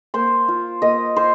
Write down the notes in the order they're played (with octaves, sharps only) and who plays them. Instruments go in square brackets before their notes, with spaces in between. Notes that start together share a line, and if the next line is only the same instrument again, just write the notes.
[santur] A#3 C5 C6
F4
A#3 D#5 D#6
F4 C5 C6